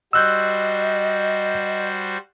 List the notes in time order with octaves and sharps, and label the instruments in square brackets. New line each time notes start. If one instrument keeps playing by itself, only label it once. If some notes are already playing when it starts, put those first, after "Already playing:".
[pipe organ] G3 F#4 C5 [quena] D#5 [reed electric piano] E6 F#6 G6